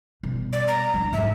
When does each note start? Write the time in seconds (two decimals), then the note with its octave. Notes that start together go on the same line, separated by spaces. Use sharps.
0.23 B2 G3
0.53 D5
0.68 A#5
0.94 G3 D4
1.13 G#2 E5